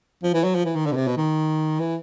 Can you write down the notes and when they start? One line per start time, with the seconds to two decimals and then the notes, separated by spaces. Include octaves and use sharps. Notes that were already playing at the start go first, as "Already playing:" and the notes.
0.23 F3
0.34 E3
0.44 F#3
0.55 F3
0.65 E3
0.76 D#3
0.86 D3
0.92 B2
0.96 C3
1.07 B2
1.17 D#3
1.80 E3